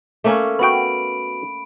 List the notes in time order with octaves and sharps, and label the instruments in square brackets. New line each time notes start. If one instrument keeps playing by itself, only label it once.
[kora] A3 A#3 C#4
[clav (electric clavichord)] B3 F#4 G5 [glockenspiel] B5 D7